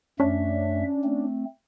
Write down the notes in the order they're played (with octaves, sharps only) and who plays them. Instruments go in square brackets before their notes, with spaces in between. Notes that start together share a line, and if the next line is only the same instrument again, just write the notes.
[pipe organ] F#2 A3 E5 [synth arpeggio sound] C#4 D4
[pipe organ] A3 C4